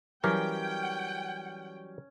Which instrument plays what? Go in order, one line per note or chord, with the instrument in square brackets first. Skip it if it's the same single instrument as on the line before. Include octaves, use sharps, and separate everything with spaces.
[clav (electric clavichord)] E3 G4 A#4 [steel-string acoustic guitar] F#3 G3 [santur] C#4 [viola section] G5